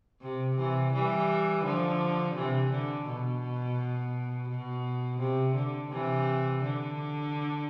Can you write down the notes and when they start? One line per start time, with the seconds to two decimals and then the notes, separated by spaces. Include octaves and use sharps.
0.22 C3
0.57 C3 E3
0.93 E3 G3
1.64 D3 F3
2.35 C3 E3
2.71 D3
3.06 B2
4.49 B2
5.20 C3
5.55 D3
5.91 C3 E3
6.63 D3